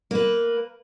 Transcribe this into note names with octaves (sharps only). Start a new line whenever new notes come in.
A#3 B4